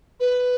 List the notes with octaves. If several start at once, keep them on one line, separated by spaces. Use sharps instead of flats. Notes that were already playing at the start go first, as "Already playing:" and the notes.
B4